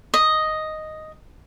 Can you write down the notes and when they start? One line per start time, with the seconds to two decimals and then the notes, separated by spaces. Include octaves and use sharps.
0.14 D#5